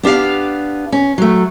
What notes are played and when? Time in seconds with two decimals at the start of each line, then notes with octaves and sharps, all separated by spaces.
0.03 B3 D4 G4 F5
0.92 C#4
1.18 F#3 A3